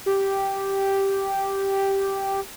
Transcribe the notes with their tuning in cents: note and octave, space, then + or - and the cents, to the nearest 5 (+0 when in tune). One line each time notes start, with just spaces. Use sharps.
G4 -5